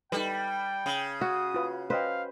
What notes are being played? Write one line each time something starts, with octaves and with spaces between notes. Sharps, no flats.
G3 D#4 A4 B4 G5
C#3
F#4 D#6
F4 B4
C#4 B4 C5 D#5 F5 G5